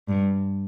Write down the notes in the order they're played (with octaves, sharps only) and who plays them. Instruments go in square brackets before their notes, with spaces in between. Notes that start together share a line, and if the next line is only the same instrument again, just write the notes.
[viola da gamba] G2